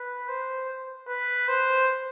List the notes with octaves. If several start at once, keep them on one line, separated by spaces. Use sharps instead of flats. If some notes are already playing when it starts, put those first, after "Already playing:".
Already playing: B4
C5
B4
C5